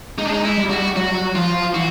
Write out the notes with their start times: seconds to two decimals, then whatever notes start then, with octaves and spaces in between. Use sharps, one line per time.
0.18 G#3 D#4
0.26 D4
0.33 D#4
0.44 E4
0.57 G3
0.70 F#4
0.96 F#3 F#4
1.35 F3 F4
1.75 E3 F#4